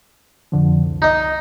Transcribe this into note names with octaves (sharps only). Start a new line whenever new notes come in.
F2 D3 F3
C2
D#4 D#5